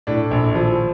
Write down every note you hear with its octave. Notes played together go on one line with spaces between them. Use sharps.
A2 D4
A#1
F3